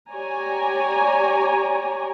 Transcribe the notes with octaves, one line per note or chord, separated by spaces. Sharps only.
G4 C#5 D5 G#5 A#5